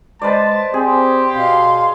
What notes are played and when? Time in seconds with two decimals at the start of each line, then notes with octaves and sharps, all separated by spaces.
0.22 G#3 B4 C5 D5 A5
0.74 C4 G4 G#4
1.31 B2 F5 C6